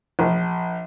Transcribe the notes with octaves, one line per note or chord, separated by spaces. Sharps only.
A#1